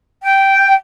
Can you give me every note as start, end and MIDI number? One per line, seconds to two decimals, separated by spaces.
0.23 0.74 79